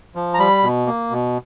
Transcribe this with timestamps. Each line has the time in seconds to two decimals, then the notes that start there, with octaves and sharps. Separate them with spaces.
0.15 F3
0.34 A#5
0.39 G3 B5
0.63 B2
0.86 A#3
1.11 B2